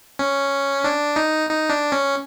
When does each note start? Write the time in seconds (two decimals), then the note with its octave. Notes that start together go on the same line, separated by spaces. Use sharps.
0.19 C#4
0.84 D4
1.16 D#4
1.49 D#4
1.69 D4
1.92 C#4